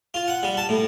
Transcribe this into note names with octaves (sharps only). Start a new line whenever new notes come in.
F4
F#5
G3
A5
A2